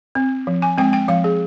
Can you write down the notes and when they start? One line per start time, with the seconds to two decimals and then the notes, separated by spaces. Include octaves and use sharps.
0.15 C4
0.47 F3
0.62 G#5
0.78 G#3 C4 G5
0.93 G5
1.08 F3 F5
1.24 G#4